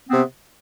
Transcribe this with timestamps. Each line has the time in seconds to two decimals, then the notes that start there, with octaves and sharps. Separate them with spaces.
0.07 C4
0.10 B3
0.13 C3